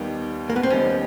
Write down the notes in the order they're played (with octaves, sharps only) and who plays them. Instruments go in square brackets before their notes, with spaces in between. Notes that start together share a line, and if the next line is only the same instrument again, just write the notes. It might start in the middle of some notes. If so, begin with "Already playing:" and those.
Already playing: [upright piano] D#2 D#3 G3 B3 D#4
[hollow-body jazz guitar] A#3
B3
C4
[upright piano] D#2 D#3 G3 B3 D#4 [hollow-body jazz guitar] C#4